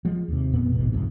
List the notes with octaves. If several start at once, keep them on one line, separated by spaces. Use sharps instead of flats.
F3 G#3
D#2 C3
F1 F2 A#2 B3
E1 A1 G#2 B2
C2 F2 G#2 C#3